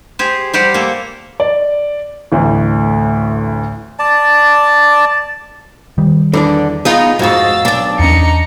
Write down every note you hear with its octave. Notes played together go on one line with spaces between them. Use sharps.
G4 G#4 C5
G3 G4 C5 D5 F#5
A#3 A4
D5
A1 D2 A2
D5 A5
D#3 G3
E2 D3 E3 D4
B3 D#4 F4 G#4
F2 G#2 G#3 F#4 F5 E6 A6
B1 D4 D5
E2 C#4 D#4 A#5 C#7